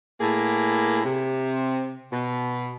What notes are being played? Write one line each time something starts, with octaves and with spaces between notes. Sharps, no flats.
A2 A#3 G#4
C3
B2